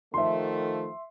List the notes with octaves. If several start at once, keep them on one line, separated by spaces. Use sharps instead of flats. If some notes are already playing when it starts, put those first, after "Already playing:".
D#3 F3 A3 E5 C6